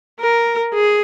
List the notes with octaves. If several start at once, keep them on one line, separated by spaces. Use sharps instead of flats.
A#4
G#4